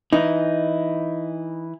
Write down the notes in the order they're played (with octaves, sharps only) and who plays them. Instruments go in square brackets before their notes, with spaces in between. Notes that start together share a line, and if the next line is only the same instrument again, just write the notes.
[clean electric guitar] E3 [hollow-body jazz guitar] D#4